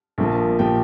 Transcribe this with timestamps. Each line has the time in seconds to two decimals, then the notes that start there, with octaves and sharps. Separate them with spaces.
0.18 A#1 A#2 F3 A#3
0.59 A#2 F3 A#3 G4 G5